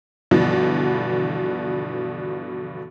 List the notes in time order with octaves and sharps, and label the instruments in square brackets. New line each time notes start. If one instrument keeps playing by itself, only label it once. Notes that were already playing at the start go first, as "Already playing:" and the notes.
[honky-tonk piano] G2 B2 D3 E3 F3 B3